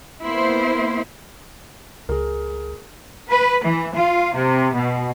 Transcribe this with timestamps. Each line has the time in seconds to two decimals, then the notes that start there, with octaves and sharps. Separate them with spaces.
0.23 A#3 B3 E4 C5
2.09 C#2 G#4 A#4
3.29 B4
3.64 E3
3.94 F4
4.34 C3
4.73 B2